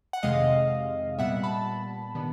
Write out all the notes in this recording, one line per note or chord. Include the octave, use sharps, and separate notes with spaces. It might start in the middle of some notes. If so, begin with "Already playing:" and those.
F#5
F2 C3 D#3 G#3 C4 D#5 F5
A#2 G3 B3 E5 F#5
A5 B5
C3 D#3 G3 B3 D4